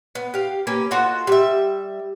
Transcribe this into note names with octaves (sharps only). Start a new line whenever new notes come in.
B3
G4 F5
A#3 C#4 B4
F4 F#4 A4 D#5
G3 E5